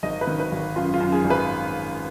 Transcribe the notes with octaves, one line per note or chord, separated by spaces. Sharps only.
G#1 D#5
B4
D#3
B4
G#1
F#2 F4
F4
F#2
G#4
G#1
B4